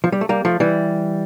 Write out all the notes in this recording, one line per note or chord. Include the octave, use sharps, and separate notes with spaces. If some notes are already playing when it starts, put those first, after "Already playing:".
F3
G3
A3
G3 A#3
F3 A3
E3 G3